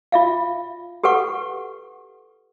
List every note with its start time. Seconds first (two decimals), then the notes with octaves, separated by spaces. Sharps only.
0.12 F4 E5 F5
1.03 G4 A4 B4 F#5 C#6